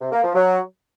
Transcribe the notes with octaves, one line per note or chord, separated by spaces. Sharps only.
C3
A#3
F3
F#3